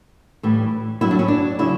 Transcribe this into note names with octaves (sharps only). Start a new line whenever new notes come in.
A2 E3 G3
G2 F#3 E4
D4
C#4
D4
C#3 F#3 E4